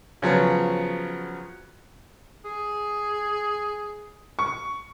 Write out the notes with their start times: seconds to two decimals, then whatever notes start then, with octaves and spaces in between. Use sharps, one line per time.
0.22 C#3 F3 F#3 B3
2.45 G#4
4.39 C#6